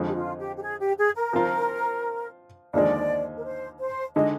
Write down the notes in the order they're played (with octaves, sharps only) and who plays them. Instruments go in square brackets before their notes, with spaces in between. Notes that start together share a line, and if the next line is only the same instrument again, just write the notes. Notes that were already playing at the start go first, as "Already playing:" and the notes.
Already playing: [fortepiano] F2 D3 F3 G#3
[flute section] G4
F4
G4
G4
G#4
G4
G#4
A#4
[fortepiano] F3 C4 F4
[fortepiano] D#2 D3 F3 G#3 [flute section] D5
[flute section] A#4
C5
C5
[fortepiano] D3 G#3 [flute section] D#5